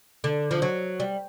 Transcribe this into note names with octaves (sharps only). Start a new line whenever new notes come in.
D3
F3
F#3
G3